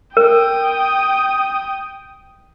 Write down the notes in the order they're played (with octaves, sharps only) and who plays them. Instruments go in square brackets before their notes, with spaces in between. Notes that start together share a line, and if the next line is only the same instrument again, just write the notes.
[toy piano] A#4 [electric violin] G5 D#6